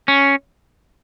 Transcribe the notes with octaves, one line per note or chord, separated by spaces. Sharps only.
C#4